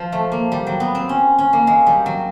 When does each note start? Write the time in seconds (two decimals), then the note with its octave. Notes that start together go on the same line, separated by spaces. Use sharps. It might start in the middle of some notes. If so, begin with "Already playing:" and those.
Already playing: F3
0.12 A3
0.32 A#3
0.52 G3
0.67 F#3
0.80 B3
0.95 C4
1.09 C#4
1.38 C#4
1.53 A#3
1.67 G#3
1.86 G3
2.06 F#3